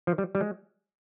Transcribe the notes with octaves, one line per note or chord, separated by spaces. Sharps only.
F3
G3
G3
G#3